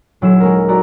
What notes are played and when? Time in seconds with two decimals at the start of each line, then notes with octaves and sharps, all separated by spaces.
0.21 D#1 F#3 E4 C7 E7
0.40 G#3 C#4 A#4
0.68 E4 F#4 D5 A#5